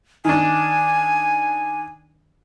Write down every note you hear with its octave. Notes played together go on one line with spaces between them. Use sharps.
D#3 D4 G#5